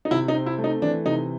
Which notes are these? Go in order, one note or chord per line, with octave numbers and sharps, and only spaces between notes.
D#4
C3 E4
D#4
C4
E4
A3
D#4
E3 D4
C3 D#4